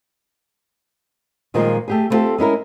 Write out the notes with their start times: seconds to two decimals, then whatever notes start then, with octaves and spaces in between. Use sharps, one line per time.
1.54 A#2 D#3 F3 G3 G#3 A#3
1.88 A3 G4 G#4
2.10 A3 B3 C4 F4 G4 A4
2.38 G#3 C#4 E4 A#4